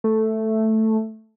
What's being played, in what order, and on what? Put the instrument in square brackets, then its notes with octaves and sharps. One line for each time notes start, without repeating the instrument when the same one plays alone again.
[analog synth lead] A3